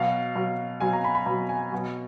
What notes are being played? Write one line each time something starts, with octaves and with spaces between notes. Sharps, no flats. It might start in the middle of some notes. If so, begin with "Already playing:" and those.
Already playing: B2 F#3 F5
B2 F#3
B2 F#3 G#5
A#5
B5
B5
B2 F#3 A#5
G#5
B2 F#3